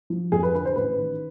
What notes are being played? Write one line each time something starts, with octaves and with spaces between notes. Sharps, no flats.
F3
F2 G#4
B4
D3 B4
C5
A1 B4
D#3